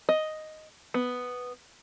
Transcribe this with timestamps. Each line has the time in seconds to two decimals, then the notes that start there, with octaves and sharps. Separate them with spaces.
0.09 D#5
0.94 B3